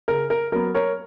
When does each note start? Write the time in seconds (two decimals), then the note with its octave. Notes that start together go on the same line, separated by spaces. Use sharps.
0.08 C#3 A#4
0.30 A#4
0.52 F#3 B3 A#4
0.75 A#4 C#5